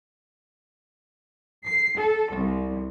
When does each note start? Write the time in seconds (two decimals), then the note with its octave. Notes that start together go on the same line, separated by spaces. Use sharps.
1.65 C7
1.97 A4
2.34 C2